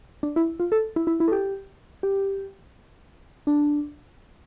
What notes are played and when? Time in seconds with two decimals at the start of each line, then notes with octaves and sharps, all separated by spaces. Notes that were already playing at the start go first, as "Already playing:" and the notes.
0.23 D4
0.36 E4
0.60 F4
0.72 A4
0.96 E4
1.07 E4
1.20 E4
1.28 A4
1.32 G4
2.03 G4
3.47 D4